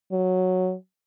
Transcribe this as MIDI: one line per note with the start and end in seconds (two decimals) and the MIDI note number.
0.12 0.74 54